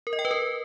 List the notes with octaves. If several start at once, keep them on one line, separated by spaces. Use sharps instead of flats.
A#4
D#5
G5
B4
A#4